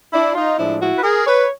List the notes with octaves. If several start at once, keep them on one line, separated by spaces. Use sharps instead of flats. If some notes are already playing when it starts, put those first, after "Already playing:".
D4 E4
D#4 F4
A2 F3 G#3 D4 E4
E4 F#4
B4
G#4 A#4
B4 C#5